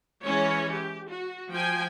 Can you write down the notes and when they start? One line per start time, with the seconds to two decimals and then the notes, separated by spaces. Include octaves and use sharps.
0.23 E3 G#3 C#4 C#5
0.71 G4
1.08 F#4
1.54 F3 G5 G#5